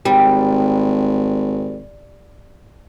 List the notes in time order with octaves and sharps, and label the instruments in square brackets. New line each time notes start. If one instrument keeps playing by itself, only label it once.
[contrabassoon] G#1 [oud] G3